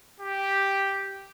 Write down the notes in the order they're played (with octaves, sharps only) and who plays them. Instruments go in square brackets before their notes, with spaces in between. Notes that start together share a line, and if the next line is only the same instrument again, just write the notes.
[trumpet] G4